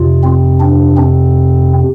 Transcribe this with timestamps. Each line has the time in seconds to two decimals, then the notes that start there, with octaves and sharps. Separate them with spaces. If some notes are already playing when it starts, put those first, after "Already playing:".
Already playing: F2 C3 F4
0.24 C4
0.60 D4
0.97 C4